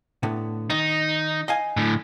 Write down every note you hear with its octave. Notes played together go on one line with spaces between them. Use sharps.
A2 D3 B3
D#3 D#4
D#5 F5 G#5
A2 D3